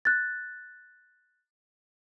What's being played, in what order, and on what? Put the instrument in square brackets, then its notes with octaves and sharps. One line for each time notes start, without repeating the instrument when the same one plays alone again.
[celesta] F#6 A6